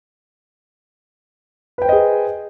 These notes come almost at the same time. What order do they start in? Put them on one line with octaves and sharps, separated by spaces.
B4 G5 C5 D#5 G#4